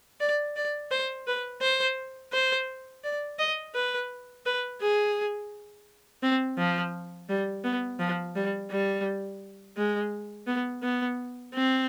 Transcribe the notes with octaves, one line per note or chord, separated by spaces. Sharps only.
D5
D5
C5
B4
C5
C5
D5
D#5
B4
B4
G#4
C4
F3
G3
B3
F3
G3
G3
G#3
B3
B3
C4